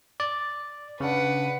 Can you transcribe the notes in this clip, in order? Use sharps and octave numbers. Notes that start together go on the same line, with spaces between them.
D5
C#3 D4 B4 F#5